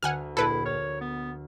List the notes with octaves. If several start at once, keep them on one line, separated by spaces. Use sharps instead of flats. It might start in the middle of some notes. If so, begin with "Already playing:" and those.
D2 F#5 G#5 F6
A#1 E4 A4 B4 C6
C#5 F6 A6
B3